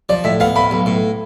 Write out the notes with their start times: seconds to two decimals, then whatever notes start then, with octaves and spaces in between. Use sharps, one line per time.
0.09 F3 D5
0.24 A2 E5
0.40 B3 F5
0.56 A2 B5
0.71 B1
0.86 A2